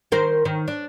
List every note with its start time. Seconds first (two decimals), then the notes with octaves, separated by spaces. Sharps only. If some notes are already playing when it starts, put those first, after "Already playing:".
0.12 D#3 A#4 C5
0.45 D#3
0.68 D4